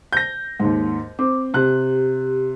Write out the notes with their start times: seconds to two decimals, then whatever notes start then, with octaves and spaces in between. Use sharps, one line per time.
0.13 G6 A#6
0.60 D#2 G#2
1.19 C4 D6
1.54 C3 G4 F#6